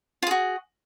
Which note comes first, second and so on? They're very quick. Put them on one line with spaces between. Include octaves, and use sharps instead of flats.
F4 G#4 F#4